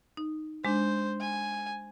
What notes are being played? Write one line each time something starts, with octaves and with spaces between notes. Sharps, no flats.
D#4
G#3 D4 C5
G#5